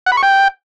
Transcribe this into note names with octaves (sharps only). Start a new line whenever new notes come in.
F#5
B5
C#6
G5